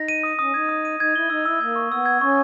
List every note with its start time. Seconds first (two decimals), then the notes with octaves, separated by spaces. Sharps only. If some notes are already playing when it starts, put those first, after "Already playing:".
Already playing: D#4 A#6
0.08 D#7
0.23 D#6
0.39 C#4 D#6
0.54 D#4 G#6
0.69 D#6
0.85 D#7
0.99 D#4 G#6
1.15 E4 G7
1.30 D#4 E6
1.45 E4 E6
1.61 A#3 G#6
1.76 C#6
1.90 B3 E6
2.06 G#6
2.21 C#4 C#6